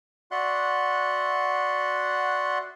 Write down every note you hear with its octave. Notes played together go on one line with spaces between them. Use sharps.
F#4 D5 E5 F#5 C6 F#6